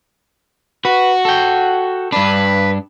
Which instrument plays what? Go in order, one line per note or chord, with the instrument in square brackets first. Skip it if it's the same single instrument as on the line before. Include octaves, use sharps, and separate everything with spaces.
[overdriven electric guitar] F#4 [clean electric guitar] B4
[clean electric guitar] A4 G5
[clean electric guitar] G2 D4 [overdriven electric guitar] B4